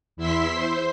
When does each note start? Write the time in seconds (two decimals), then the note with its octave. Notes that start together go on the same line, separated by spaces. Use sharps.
0.17 E2 E4 E5 C6 B6
0.54 C5